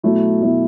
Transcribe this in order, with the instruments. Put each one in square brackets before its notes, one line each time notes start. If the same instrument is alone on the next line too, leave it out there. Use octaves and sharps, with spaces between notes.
[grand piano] B2 F#3 A3 E4
B2 F#3 A3 E4